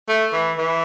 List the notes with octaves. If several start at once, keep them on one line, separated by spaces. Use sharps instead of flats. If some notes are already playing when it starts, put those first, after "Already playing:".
A3
E3
E3